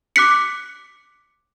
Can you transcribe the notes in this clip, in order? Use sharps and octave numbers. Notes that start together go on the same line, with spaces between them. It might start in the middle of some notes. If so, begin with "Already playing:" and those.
D6 F#6 B6 C#7